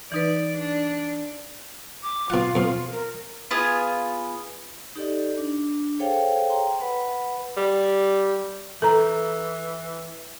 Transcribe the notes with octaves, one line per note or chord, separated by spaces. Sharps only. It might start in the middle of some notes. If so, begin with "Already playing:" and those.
E3 D#4 B4 D5
D4
D6
B2 F4 F#5
F2 B2
A#4
B3 F4 G#4
D#4 G4 A4 D5 D#5
D4
G#4 A4 C5 C#5 F5 G5
G5 A#5 C6
B4 F#5 B5
G3
E3 A4 A#5